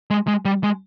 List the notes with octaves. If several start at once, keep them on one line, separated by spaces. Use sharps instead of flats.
G#3
G#3
G3
G#3